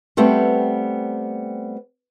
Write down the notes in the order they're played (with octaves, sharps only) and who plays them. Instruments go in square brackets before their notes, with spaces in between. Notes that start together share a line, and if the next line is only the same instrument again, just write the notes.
[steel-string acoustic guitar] G3 A3 B3 C4